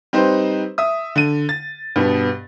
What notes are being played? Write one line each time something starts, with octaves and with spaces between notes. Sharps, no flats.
G3 C4 D#4 B4 C5
E5 D#6
D3 D#7
A6
G2 B2 B3